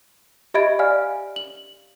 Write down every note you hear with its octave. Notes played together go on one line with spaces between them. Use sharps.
G4 D#5 E5 B5 G#6 D7
D5 F5 G#5 F6
F#7